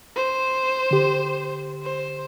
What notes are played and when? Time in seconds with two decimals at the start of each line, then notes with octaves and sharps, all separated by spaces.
0.16 C5
0.91 D3 G4
1.83 C5